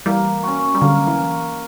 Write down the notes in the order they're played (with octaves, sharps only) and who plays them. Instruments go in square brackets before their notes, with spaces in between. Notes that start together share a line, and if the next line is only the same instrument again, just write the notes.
[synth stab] E3 G3 [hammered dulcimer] A#3
[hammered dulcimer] C#4 F#4
[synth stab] G3
[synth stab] D3 F#3 [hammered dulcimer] A#3
[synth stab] E3